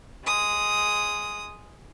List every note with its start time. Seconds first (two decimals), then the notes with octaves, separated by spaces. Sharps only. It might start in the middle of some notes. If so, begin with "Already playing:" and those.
0.24 G#3 D#6